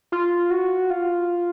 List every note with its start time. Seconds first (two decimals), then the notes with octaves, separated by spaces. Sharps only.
0.12 F4
0.51 F#4
0.90 F4